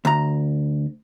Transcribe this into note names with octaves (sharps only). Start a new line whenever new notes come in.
D2 A#5